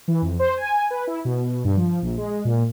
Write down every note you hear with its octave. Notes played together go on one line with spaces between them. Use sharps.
E3
F2
C5
G#5
B4
E4
B2
G2
F3
A#1
G#3
A#2